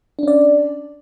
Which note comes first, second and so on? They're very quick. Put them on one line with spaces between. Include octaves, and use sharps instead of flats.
D4 C#4 D5